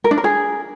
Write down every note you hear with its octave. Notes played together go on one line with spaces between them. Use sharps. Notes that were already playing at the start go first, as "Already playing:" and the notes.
A#4
D4
A#4
G#4